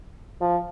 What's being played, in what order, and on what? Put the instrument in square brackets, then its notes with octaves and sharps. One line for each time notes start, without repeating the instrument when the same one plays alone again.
[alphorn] F3